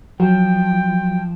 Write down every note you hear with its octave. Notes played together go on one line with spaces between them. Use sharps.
F3 F#3 G5